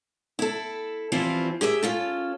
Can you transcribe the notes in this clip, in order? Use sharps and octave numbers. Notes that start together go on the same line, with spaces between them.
E4 A4
E3 F3 G3 C4 E4 F4
G4 G#4 C#5 E5
C#4 F4 A4